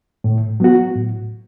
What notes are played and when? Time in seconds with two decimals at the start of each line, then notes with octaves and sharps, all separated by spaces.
0.24 A2
0.60 F#3 B3 F#4
0.95 A2